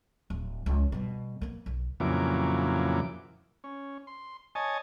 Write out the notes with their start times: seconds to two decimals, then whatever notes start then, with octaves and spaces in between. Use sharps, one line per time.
0.30 D1
0.66 C#2
0.92 B2 G3
1.41 A#3 B3
1.66 B1
2.00 F2 A#2 C#3 E3 F#3 D6
3.64 C#4
4.07 C6
4.55 C#5 D#5 G#5 A5